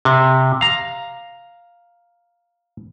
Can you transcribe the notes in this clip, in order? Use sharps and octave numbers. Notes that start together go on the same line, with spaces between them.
C3
F5 A#5